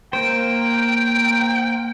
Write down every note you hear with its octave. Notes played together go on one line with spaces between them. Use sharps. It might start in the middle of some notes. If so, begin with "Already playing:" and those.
A#3 C5 G5